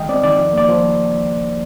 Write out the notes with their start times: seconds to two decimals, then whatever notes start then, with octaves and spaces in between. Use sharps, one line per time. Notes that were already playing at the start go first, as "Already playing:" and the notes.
Already playing: D#3 G#3 D#5 G5
0.09 C4 D5
0.24 D#3 D5
0.38 F3
0.53 A#3 D5
0.68 F3 C5